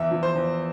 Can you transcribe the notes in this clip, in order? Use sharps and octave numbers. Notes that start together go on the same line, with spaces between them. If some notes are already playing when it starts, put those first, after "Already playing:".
Already playing: E2 E5
F3
C5
E2